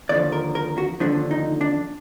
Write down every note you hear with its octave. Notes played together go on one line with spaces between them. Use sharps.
D#2 D3 F3 D5
A#4
A#4
F#4
D#2 D3 F3 D4
D#4
D4